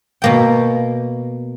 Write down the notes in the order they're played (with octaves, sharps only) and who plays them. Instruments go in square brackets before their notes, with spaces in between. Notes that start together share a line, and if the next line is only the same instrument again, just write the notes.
[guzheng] B2 A#3 G5